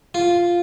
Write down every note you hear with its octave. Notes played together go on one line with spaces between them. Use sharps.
F4